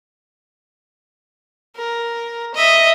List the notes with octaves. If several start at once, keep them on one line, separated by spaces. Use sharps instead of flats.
A#4
D#5 E5